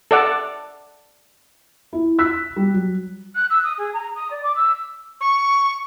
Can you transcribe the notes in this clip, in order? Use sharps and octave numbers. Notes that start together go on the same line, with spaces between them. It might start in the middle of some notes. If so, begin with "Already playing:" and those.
A4 D5 F#5
E4
E6 F#6 B6
G3
F#3
F#6
E6
D#6
G#4
A#5
D#6
D5
D6
E6
C#6